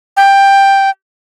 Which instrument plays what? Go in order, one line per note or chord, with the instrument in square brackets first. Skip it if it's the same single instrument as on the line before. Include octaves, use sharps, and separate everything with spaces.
[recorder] G5